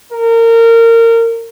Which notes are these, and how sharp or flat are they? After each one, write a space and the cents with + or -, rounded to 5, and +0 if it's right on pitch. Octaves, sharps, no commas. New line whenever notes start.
A#4 -25